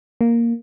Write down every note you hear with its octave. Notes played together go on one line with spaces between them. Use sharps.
A#3